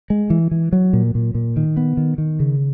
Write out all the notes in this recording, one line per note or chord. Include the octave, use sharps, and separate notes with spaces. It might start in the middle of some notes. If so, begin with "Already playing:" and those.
G#3
E3
E3
F#3
A#2
A#2
A#2
D#3
B3
D#3
D#3
C#3